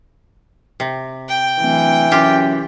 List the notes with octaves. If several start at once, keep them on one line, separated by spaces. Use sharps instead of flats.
C3
G5
D1 E3
F#2 F4 G4